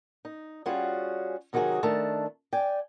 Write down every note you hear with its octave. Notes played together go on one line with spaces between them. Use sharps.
D#4
G3 C#4 F4 F#4 G#4
C3 D#3 F#3 F4 F#4 G#4
D#3 A3 D4 A5
D5 G5 G#5